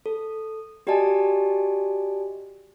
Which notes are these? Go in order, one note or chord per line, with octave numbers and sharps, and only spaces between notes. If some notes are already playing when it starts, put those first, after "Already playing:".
A4
F#4 G4 D5 D#5 G#5 A5